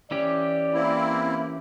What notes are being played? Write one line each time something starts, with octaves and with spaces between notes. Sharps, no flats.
E3 C#4 G4 D5
A#3 C4 E4